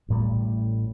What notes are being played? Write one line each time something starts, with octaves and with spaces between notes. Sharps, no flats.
A1 A2 G3